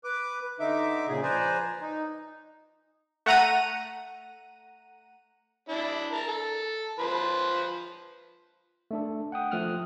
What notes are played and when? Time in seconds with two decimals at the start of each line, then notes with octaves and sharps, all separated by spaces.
0.04 B4 D6
0.60 D3 D#4 E5 D6
1.08 A#2 C#3 G#4
1.23 F3 B4 C5 D5 G#5 A#5
1.81 D#4
3.26 A3 F#5 A#5 D#7
5.69 D4 E4
6.12 A#4 A5
6.27 A4
6.99 F3 B4 C5
8.91 A3 D4 A4
9.32 F#5 G5 D#6
9.51 F3 A3 D#6 F6 F#6